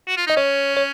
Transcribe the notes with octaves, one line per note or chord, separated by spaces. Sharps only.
F#4
F4
D#4 D#5
C#4 C#5
C#5